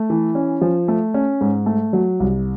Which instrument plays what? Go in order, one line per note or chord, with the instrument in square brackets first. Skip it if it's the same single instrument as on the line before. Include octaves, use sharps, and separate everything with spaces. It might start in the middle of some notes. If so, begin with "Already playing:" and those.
Already playing: [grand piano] A3
E3
C#4
F3
A3
C#4
G#2
A3
F#3
C2